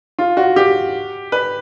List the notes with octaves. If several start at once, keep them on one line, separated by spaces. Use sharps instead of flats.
F4
F#4
G4
B4